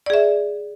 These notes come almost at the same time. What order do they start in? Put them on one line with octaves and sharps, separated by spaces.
D5 G#4 E5